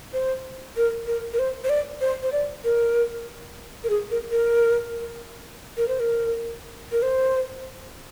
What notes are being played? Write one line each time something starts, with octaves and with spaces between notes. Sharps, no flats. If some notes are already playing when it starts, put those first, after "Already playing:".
C5
A#4
A#4
A#4
C5
C5
D5
C5
C5
D5
A#4
A#4
G#4
A#4
A#4
A#4
C5
A#4
A#4
C5